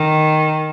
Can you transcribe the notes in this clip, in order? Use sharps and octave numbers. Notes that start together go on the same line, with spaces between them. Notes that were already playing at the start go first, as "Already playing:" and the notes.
Already playing: D#3